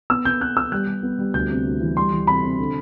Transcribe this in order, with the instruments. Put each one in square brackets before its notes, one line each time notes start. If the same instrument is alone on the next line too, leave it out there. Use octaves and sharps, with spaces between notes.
[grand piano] B3 E6
B3 G6
B3 F#6
B3 E6
G3 F#6
G3
B3
G3
D2 G6
C3
D2
E3
G3 C6
E3
C3 B5
C3
D3